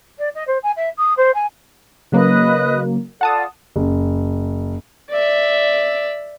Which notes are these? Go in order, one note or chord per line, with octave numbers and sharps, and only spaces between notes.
D5
D#5
C5
G#5
E5
D#6
C5
G#5
C#3 F#3 A#3 B4 D#5 F#6
F4 A4 D5 F#5 A5 D#6
F#1
D5 E5